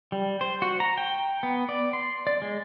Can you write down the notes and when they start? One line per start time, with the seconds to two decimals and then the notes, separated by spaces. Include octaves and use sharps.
0.12 G3
0.41 C5
0.62 F#4
0.80 A#5
0.98 G5
1.43 B3
1.69 D5
1.93 C6
2.27 D5
2.42 G#3